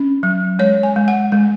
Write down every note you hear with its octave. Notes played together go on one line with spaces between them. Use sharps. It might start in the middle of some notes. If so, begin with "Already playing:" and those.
Already playing: C#4
F#3
G#3 C#5
G#5
G#3
F#5
G#3